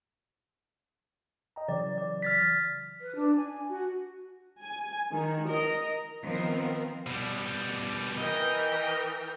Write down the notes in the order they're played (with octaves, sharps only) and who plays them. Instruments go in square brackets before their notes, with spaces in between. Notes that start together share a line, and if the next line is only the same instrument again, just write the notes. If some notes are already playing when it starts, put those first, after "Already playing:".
[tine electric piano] D#5 G5 A#5
[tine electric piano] C#3 E3 F#3 [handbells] D5
[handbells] D5
F6 A6 B6
[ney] B4
D4
G#5
F#4
[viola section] G#5
D#3
[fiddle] A#4 [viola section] D#5
[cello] D#3 F3 [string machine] B3 C4 A#4
[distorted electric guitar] B2 G3
[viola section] E3 A#4 G5 [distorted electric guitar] D#5